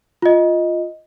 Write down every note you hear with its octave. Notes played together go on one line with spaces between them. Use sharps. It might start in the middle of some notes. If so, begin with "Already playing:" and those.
F4 D#5